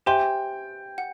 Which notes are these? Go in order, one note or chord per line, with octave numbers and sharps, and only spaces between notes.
G4 C5 E5 G5 G#5 C6
F#5